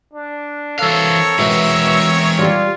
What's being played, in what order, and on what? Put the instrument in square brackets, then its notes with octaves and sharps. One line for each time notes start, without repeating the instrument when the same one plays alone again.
[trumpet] D4
[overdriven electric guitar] E3 F5 [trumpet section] C4 A#4 C#5 [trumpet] A4
[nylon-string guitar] B2 [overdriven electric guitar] E3 G#3 [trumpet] E5
[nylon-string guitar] G3 G4 [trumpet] F4